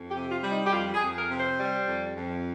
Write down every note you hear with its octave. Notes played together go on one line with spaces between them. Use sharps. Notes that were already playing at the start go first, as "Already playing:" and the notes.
Already playing: F2
G4
C3
F4
G3
D#4
G4
F2 F4
G#4
F2
A#4
C3
C5
G3
F2
F2